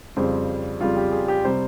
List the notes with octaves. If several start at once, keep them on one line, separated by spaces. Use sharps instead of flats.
F2 C#3 G3 C5
F2 C#3 G3 F4
G4
G#4
G4
C3 G3 C5